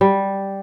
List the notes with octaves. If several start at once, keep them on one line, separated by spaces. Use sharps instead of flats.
G3